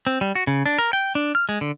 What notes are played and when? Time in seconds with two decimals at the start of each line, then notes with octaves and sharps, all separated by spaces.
0.07 C4
0.21 G3
0.35 F#4
0.47 C#3
0.66 D4
0.78 A#4
0.93 G5
1.15 D4
1.35 F6
1.49 G#3
1.61 D3